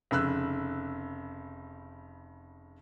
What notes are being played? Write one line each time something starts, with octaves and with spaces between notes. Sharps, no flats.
F1 C#3 E6 F#6